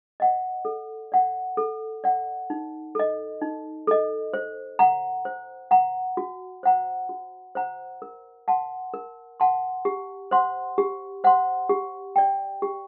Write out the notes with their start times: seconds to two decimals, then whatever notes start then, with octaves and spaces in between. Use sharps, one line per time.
0.20 D#5 F#5
0.65 A4
1.12 D5 F#5
1.57 A4
2.04 D5 F#5
2.50 D#4
2.95 A4 D#5
3.41 D#4
3.87 A4 D#5
4.33 C5
4.79 F#5 A#5
5.25 C5
5.71 F#5 A#5
6.17 F#4
6.63 C5 F#5 A#5
7.09 F#4
7.55 C5 F#5 A#5
8.02 A#4
8.48 F#5 A5 C6
8.94 A#4
9.40 F#5 A5 C6
9.85 G4
10.31 C5 F#5 C6
10.78 G4
11.24 C5 F#5 C6
11.69 G4
12.16 D5 G5
12.62 G4